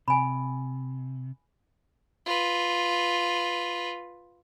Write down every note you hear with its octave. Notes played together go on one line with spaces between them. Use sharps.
C3 G#5 B5
F4 B4